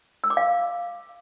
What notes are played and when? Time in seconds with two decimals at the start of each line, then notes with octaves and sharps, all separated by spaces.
0.24 E6
0.30 D6
0.37 F5